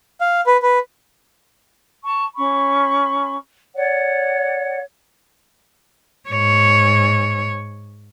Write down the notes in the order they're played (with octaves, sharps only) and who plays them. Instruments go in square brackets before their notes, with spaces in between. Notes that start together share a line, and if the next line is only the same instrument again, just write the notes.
[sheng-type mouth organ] F5
B4
B4
[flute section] A5 C#6
C#4 B5 C#6
C#5 D5 F#5
[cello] G#2 C#5